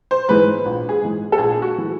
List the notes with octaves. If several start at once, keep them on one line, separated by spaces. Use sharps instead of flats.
C5
G#2 E3 B4
A#1
G#4
G#2 E3
A4
A#1 G#4
F#4
E3